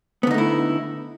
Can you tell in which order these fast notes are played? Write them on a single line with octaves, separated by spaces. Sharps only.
B3 D3 D#4 A3 E4